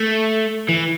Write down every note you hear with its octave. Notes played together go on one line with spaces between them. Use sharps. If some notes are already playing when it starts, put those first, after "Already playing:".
Already playing: A3
E3